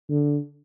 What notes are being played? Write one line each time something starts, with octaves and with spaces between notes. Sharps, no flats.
D3